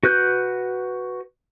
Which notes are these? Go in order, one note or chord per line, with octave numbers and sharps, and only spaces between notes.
F#4 B4 F#6 G6